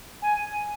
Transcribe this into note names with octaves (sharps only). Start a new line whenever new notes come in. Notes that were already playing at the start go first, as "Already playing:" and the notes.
G#5